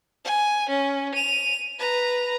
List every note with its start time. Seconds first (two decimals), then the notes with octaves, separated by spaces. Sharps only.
0.25 G#5
0.69 C#4
1.14 D#7 F7
1.79 B4 A#5